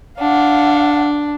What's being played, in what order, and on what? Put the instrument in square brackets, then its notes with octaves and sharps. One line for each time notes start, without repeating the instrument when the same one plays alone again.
[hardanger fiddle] D4 [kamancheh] F5 F#5